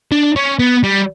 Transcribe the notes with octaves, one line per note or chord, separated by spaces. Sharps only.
D4
C#4
B3
G3